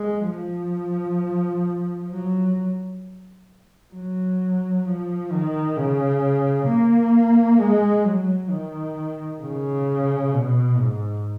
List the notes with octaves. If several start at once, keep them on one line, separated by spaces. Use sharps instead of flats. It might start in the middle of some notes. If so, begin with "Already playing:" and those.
Already playing: G#3
F3
F#3
F#3
F3
D#3
C#3
A#3
G#3
F#3
D#3
C#3
B2
G#2